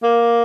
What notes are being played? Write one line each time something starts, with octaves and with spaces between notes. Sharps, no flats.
A#3